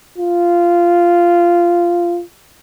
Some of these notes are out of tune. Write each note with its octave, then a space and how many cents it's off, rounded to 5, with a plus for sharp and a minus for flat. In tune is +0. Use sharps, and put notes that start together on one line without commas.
F4 -10